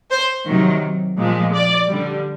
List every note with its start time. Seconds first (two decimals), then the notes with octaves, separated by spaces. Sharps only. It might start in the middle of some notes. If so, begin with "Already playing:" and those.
0.11 C5
0.46 C3 D#3 F#3
1.18 A#2 F3 G#3
1.53 D5
1.88 D3 G3